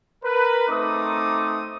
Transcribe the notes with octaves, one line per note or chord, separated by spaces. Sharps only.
A#4 B4
A3 C4 D#4 D6 D#6